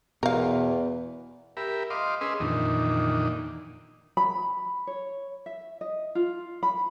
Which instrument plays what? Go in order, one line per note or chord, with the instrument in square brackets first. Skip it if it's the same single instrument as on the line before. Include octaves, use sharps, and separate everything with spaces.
[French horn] E2 [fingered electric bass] B2 [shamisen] A#4 F5
[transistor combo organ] G4 A#4 E5 B5
D#5 F5 C6 D6
C#4 G#4 B4 D#5 C6 E6
F2 A#2 D#3 E3 D4 D#4
[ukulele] B5
C#5
E5
D#5
F4
B5